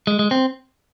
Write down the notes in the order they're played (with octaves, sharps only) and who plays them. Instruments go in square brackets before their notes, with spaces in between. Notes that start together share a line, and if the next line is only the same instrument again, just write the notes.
[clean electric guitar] G#3
G#3
C4